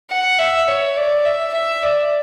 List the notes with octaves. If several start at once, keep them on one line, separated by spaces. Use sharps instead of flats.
F#5
E5
C#5
D5
E5
E5
D5